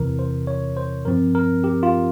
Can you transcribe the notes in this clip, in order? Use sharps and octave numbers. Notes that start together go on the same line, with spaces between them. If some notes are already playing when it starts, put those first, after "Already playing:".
Already playing: E2 C3 E3 A#4
C5
C#5
C5
G2 F3 C4 A#4
A#4
G4
F4